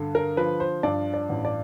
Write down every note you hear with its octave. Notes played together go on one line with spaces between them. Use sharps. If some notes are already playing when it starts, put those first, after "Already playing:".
Already playing: G2 D3
A#4
F3 B4
C5
G2 D5
D5
A1
D5